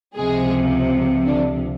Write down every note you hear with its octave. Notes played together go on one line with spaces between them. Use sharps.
C#2 C3 F3 G#3 G#4
D3 D4